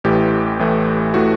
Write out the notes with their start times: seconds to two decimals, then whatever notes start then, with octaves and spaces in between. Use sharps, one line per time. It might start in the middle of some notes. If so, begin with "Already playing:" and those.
0.04 A1 A2 E3 A3 G4
0.59 A1 A2 E3 A3
1.14 A2 E3 A3 F#4